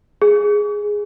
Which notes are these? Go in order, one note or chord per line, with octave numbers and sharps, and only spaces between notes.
G#4